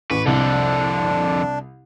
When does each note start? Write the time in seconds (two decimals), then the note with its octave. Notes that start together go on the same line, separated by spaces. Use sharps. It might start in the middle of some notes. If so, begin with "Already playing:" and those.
0.11 A1 B4 C#6 D6
0.26 C2 F2 D3 D4